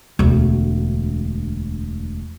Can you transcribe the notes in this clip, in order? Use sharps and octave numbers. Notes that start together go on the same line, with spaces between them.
E1 D2